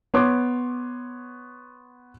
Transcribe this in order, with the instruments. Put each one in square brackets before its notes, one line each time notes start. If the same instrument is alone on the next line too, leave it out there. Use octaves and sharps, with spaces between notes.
[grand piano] B3 C#5 C6 D6